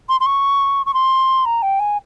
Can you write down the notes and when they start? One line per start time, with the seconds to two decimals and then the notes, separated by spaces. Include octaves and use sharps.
0.09 C6
0.20 C6
0.26 C#6
0.86 C#6
0.94 C6
1.45 A#5
1.62 G5
1.79 G#5